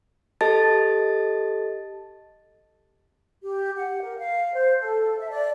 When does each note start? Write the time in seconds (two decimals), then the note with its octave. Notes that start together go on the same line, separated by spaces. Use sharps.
0.41 G4 A4 D#5 A5 A6
3.43 G4
3.76 F#5
4.02 A#4
4.18 F5
4.54 C5
4.81 A4
5.18 E5
5.31 D5